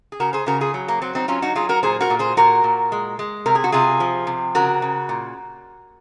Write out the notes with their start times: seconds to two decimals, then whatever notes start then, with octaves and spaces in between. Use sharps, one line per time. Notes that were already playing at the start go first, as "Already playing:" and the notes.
0.12 G#4
0.20 C#3 F#4 A#4
0.33 G#4 C5
0.46 C#3 F#4 A#4
0.61 F4 G#4
0.74 F#3
0.88 A#3
1.02 F#3 C4
1.15 C4 D#4
1.28 F#3 C#4 F4
1.42 D#4 F#4
1.55 F#3 F4 G#4
1.69 F#4 A#4
1.83 A#2 G#4 C5
2.01 F#4 A#4
2.10 A#2
2.19 G#4 C5
2.37 A#2 F#4 A#4
2.64 A#2
2.92 G#3
3.19 G#3
3.46 C3 A#4
3.55 G#4
3.64 F#4
3.72 C3 F4 G#4
4.00 F3
4.27 C3
4.55 C#3 F#4 A#4
4.82 C#3
5.09 A#2